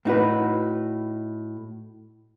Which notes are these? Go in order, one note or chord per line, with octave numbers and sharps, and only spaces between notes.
A2 D#4 F#4 B4